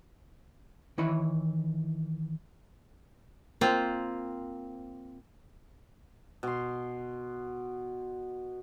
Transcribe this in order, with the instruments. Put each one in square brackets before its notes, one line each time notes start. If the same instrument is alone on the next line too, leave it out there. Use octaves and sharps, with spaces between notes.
[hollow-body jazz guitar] D#3 E3 E4 C#5 B5
[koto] A#3 C4 F4
[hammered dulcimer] B2 C6